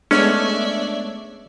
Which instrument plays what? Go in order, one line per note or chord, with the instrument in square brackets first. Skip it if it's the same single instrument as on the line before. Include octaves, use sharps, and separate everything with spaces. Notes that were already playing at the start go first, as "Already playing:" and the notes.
[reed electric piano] G#3 A3 B3 [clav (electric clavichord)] C#4 [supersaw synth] D4 C#5 [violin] D5 E5